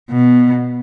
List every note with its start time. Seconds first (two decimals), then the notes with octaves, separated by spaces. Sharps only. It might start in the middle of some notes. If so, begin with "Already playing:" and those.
0.10 B2